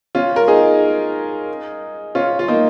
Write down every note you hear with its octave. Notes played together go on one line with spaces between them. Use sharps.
C#4 F4
A#4
D#4 G#4
C#4 F4
F4
A#3 D#4